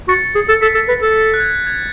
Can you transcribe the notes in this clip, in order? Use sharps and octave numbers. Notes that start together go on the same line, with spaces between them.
F#4 A6 C#7
G#4
A4
A4 B6
A4
B4
A4
A6
F#6
G#6
G#6